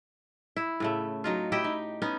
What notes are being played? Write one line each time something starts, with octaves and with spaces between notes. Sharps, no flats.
E4
A2 C#3 A3
F#3 D#4 F4
E4 G4 D#5 G5
D#4
B3 C#4 D#4